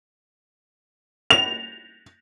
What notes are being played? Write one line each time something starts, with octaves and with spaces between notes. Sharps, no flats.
F7